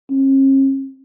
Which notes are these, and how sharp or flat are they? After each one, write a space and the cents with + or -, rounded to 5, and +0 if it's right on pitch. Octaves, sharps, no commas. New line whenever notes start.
C#4 -45